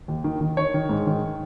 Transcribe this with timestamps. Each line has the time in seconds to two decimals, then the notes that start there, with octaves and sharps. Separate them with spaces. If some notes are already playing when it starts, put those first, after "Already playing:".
0.08 D#2
0.24 D#3
0.41 D#3
0.57 D#3 C#5
0.74 D#3
0.89 G#2
1.06 D#3